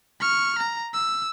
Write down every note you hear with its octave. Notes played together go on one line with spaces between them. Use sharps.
C#6 F6
A#5
E6